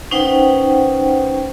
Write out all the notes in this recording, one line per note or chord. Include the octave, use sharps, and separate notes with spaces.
C#4 D#4 B4 C5 F#5 G5